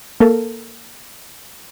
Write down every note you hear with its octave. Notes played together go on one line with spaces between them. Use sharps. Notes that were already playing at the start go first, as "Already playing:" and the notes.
A#3 A4 A#4